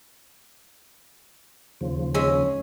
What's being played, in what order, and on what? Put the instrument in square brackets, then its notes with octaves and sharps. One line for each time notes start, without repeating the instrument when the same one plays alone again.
[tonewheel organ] D#2 C#3 F3
[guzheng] G#3 C#4 E5